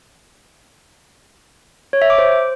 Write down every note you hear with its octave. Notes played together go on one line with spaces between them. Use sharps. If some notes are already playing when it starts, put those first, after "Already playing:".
C#5
E5
D6
C5